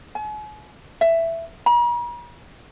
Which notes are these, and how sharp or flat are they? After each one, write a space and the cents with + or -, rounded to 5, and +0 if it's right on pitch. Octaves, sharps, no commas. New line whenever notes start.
G#5 +40
E5 +10
A#5 +45